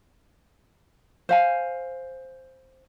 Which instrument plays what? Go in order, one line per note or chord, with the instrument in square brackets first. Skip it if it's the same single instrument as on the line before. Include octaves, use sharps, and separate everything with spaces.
[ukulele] C5 F5 G#5